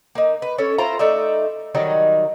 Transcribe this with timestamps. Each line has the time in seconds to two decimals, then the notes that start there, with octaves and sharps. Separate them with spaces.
0.15 A#3 D#4
0.42 B4
0.58 C#4 A4 C#5
0.78 E4 F4 C5 A#5
0.99 A3 D#4 D5 E5
1.75 D#3 F#3 G3 D#4